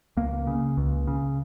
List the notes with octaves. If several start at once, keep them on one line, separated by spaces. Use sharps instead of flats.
C#2 A#3
C#3
C#2
C#3